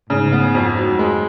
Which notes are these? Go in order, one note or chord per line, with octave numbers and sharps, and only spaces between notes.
G#2 C#3
B3
F2
F#3
G#3